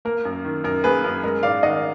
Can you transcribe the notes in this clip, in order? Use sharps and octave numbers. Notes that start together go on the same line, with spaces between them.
A#3 A#4
F#2
D#3
F#2 A#4
A#3 G#4 B4
F#2 A#4
G#3 A#4
G#2 D5 F5
D#3 D#5 F#5